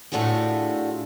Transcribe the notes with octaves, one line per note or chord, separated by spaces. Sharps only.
A2 A3 D4 F4 F#4 G#4